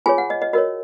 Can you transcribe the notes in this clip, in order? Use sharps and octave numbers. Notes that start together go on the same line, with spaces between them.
F4 G#4 C#5 G#5
F#5
D#5
D#5
F#4 A#4 C#5 D#5